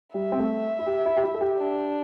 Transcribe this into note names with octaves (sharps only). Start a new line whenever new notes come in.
G3 E5
C4
A3
E4
G4
E4
G4
E4
A4
G4
D4